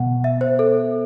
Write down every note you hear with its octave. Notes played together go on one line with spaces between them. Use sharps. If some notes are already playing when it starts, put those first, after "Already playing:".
Already playing: B2 F#5
E5
C5
A4